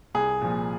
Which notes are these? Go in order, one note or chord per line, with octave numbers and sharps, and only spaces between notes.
C2 G#4
A#2 F3